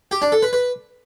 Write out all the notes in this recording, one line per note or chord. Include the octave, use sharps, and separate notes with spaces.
G4
D4
A4
B4
B4